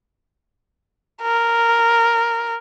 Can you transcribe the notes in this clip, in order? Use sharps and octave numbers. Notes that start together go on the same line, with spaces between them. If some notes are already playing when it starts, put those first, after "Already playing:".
A#4